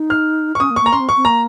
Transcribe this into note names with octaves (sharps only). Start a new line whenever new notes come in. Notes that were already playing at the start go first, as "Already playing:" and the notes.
Already playing: D#4
F6
C#6
C#4 D#6
A#3
C#6
A#3 A#5
C#4 C6
C4
C#6
C4
A#3 A#5